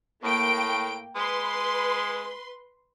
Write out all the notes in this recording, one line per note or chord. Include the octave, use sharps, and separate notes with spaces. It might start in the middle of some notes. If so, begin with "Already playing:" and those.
A2 A#3 G5 D7
G#3 B4 C6